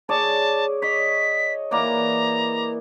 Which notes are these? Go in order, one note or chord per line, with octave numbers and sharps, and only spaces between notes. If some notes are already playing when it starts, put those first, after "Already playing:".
G#4 C#5 D5 A5
C#5 D#5 B6
E3 A#3 D5 A#5